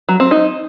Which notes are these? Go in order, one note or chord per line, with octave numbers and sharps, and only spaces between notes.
F#3
C4
D#4